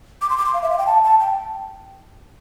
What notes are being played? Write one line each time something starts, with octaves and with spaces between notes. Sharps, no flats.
D6
C6
D6
C6
F5
E5
F5
G5
A5
A5
G5